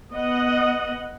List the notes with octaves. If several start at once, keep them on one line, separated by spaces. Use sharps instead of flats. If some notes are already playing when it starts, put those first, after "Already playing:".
B3 D#5 F#5